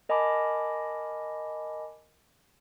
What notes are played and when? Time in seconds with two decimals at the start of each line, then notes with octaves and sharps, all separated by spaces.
0.09 A#4 D#5 G#5 A5 B5 D6